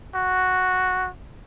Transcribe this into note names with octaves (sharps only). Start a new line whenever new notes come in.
F#4